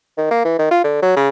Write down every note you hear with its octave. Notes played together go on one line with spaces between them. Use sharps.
D#3
A#3
E3
D#3
F4
D3
F#3
C#3